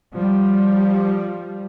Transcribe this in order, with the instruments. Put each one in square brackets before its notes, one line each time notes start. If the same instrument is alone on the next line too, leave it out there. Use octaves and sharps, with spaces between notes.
[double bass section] F3 G3